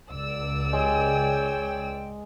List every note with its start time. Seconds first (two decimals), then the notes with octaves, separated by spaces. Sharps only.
0.11 C#2 D5 E6
0.73 G#3 C#5 G5